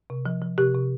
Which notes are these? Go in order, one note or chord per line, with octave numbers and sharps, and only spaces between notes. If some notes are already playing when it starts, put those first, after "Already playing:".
C3
F3
F3
C3 G4
C3